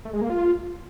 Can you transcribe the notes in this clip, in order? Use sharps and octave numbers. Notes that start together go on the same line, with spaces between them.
A3
G#3
A#3
F4